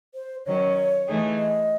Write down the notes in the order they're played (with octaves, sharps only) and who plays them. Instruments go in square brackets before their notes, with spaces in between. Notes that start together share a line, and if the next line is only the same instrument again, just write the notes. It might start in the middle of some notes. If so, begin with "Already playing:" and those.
[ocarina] C5
[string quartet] D#3 F#3 C#4 [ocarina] C#5
[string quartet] E3 A3 D#4 G#4
[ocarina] D#5